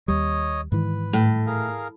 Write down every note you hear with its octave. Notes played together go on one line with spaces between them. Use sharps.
D#2 G3 C#5 D#5 D#6
G#2 D#3 E3 B4
A2
G#4 A#4 F5